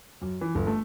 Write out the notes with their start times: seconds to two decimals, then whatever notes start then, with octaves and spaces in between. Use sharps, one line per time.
0.21 F#2
0.41 E3
0.55 G1
0.67 A3